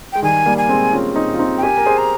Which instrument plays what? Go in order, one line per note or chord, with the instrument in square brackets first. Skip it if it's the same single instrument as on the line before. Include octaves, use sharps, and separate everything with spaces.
[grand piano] G#3 [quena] G5
[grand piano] D#3 G3 [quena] G#5
[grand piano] G3 A#3
[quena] G#5
[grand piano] G#3 C4
C#4 F4
C4 D#4
F4
C4 D#4
[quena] G5
[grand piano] G4 A#4 [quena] G#5
[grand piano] A#4
G#4 C5
[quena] A#5